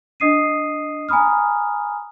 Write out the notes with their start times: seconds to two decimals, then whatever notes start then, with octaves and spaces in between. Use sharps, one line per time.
0.20 D4 D#5 D#6 C7 D#7
1.09 G#5 A#5 B5 D#6 F6